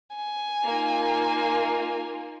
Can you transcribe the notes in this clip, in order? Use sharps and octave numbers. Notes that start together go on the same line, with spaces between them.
G#5
A#3 D#4 F4